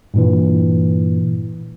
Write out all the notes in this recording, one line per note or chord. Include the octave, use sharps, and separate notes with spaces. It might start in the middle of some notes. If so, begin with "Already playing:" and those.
G2 A#2 E3